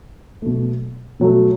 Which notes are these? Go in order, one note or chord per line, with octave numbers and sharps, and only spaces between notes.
B2 F#3 A3
B2 F#3 A3